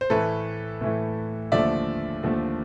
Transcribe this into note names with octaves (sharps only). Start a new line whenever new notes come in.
C5
A2 E3 A3 A4 B4
A2 E3 A3
D#2 D3 F3 A3 D5 E5
D#2 D3 F3 A3